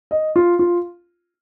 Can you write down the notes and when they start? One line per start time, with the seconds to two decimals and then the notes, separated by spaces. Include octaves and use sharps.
0.11 D#5
0.36 F4
0.59 F4